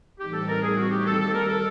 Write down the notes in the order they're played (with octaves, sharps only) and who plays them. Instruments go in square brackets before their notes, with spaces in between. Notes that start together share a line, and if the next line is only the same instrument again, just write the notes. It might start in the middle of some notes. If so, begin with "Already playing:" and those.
[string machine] A2 E3 G3 C4 D#4 [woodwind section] G4
[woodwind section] A4
A#4
G#4
F#4
G4
[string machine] D#3 G3 A#3 D#4 G4 [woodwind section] A4
[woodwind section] A4
A#4
A4